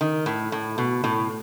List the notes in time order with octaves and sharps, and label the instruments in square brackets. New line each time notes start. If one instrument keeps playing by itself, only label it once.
[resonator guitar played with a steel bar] D#3
A2
A2
B2
A2